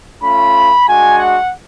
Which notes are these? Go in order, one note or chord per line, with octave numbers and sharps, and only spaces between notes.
A3 C#4 F4 B5
G#3 D4 F#4 G#5
F#5